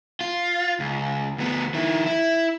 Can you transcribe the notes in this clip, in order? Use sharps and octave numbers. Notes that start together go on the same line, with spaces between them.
F4
C#2
D2 B3
D#3 E4
E4